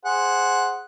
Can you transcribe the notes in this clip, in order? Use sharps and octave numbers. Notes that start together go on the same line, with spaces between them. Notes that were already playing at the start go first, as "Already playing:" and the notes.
G#4 C5 F#5